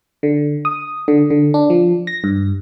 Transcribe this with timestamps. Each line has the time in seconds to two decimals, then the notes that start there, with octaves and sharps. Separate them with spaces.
0.23 D3
0.65 D#6
1.08 D3
1.30 D3
1.54 D4
1.70 F3
2.07 A#6
2.24 G2